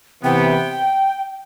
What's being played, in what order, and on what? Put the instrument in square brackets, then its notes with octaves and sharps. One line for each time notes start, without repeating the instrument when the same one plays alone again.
[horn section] C3 E3 B3 [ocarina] G5